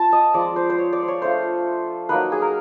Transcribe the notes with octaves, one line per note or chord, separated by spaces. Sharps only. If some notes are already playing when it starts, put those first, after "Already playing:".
Already playing: C4 F4 A5
D#5
F3 G#3 C4 D5
C5
C5
C#5
D5
C5
C#5
A3 D4 F4 C5
F#3 A#3 D#4 B4
G#4
A#4